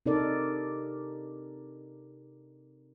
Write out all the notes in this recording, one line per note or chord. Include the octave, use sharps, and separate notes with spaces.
C3 D#4 A4 A#4 D5